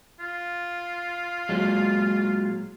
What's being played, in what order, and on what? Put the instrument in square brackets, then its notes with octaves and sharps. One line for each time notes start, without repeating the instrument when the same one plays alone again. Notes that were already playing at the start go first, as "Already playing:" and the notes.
[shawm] F4
[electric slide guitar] A#2 F#3 G#3